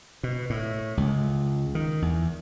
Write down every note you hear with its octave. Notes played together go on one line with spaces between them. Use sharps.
B2
A2
C#2
D#3
E2